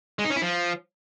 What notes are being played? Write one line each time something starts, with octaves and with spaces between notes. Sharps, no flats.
G#3
D#4
C#4
E4
F3